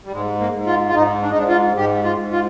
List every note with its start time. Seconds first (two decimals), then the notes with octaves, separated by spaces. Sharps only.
0.05 G3
0.13 G#2 G#3
0.40 A#3
0.53 G#2
0.67 F4
0.89 F4
0.94 G#2 D#4
1.22 D4
1.30 D#4
1.36 G#2 D4
1.49 F4
1.77 G#2 G4
2.04 F4
2.18 G#2
2.32 F4